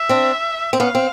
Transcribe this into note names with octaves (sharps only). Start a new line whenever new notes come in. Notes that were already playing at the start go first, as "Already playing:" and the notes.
Already playing: E5
C4 D4
C4
B3 C#4 F5
C4